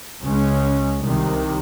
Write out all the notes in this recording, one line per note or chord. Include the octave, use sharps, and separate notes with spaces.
C#2 C#3 G#3 C#4
C2 C3 D#3